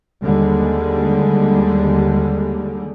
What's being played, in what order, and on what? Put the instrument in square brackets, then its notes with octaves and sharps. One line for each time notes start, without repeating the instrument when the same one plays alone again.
[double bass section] D#2 D3 G3 G#3